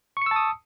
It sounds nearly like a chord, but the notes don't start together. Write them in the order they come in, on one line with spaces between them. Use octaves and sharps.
C#6 C#7 E6 A5 D#6